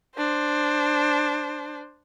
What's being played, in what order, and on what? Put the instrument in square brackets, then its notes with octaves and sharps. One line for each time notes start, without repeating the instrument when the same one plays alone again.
[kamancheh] D4 C5